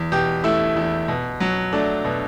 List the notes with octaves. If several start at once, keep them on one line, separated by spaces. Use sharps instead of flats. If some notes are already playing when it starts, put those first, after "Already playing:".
Already playing: E2
B2 G4
A3 E4
E2
B2
F#3
A3 D4
B2